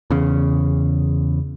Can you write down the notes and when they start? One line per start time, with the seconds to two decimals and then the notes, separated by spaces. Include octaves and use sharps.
0.10 E2 C#3